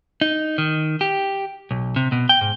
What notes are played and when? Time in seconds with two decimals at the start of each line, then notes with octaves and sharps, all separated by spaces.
0.21 D#4
0.58 D#3
1.01 G4
1.71 B1
1.96 C3
2.12 B2
2.29 G5
2.41 G#2